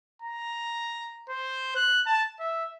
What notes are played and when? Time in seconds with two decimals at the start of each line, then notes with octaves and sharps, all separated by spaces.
0.22 A#5
1.29 C5
1.76 F#6
2.06 A5
2.40 E5